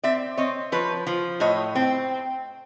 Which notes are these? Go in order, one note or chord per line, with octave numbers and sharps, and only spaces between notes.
C4 D5 E5
C4 C#5 D#5
F3 B4 C#5
F3
A2 C#5 D#5
C4